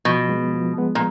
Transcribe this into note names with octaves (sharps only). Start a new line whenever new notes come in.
B2 F3
G#3 B3
F3
G#3 B3
A#2